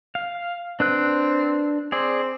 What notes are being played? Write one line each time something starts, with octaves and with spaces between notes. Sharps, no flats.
F5
C4 D4 B4 F#6
C4 G#4 D5